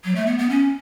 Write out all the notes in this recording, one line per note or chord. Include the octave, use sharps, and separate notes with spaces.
F#3
A3
B3
B3
C#4